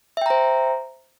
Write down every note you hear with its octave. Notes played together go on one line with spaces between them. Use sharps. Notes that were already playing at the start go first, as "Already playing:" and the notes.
C5 E5 G5 A#5